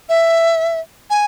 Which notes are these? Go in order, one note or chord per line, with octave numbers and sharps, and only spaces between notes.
E5
G#5